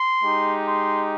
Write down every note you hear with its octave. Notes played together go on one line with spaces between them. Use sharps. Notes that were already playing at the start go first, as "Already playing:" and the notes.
Already playing: C6
G#3 D#4 G4
C6